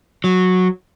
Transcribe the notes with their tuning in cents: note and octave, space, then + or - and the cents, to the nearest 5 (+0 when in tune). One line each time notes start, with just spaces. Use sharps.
F#3 -10